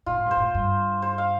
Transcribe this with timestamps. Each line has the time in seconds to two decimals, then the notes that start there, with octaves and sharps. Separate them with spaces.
0.06 A#2 F4
0.17 A2
0.26 G2 C5
0.37 A2
0.54 G2
1.02 C5
1.18 F5